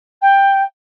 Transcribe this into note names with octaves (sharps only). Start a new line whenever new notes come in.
G5